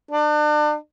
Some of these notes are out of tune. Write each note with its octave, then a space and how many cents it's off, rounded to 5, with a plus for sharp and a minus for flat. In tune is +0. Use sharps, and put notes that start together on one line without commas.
D4 +35